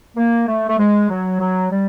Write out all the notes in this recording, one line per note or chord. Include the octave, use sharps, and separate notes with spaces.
A#3
A3
A3
G#3
F#3
F#3
G3